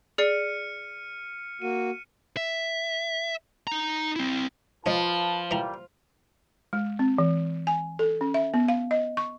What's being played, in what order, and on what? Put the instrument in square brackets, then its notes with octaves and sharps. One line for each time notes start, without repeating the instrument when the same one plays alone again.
[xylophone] G#4 D5 C7 [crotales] F6 C#7 D#7
[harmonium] A#3 F#4 [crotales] D#7
[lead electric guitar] E5
D#4 A#5
C4 E4
[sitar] F3 [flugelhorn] F4 [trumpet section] B4 A5 [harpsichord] C#5 D#5
[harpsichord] E3 A#5 [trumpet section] G3 A#3 G5
[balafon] G#3
C4
E3
G#5
A4
C#4
E5
B3
F5
D#5
C#6